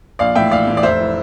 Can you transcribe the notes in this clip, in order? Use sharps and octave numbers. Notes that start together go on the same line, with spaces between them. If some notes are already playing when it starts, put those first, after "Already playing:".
A#1 D5 F5
A2 E3 E5 G5
A#1 D5 F5
A2 E3
D5
F1 C5 E5
E3